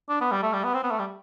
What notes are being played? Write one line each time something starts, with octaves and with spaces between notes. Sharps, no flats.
D4
B3
G3
A3
G3
B3
C4
B3
A3
G3